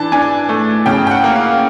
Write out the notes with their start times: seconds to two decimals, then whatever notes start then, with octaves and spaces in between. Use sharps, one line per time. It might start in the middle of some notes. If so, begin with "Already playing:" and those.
Already playing: E3 D4 A5
0.12 D4 G#5
0.49 A3
0.86 C#3 G5
1.07 G5
1.11 F#5
1.24 A#3
1.36 F5